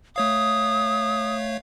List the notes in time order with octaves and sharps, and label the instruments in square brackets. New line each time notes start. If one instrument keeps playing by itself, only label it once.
[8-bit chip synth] A3 C#5 F5 [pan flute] D#6